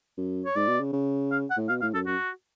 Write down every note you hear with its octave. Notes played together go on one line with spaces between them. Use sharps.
F#2
C#5
G#2 D5
B2
C#3
C#3
F5
F#5
A2
B2 F5
A2 F5
F#2 A4
F#2 F#4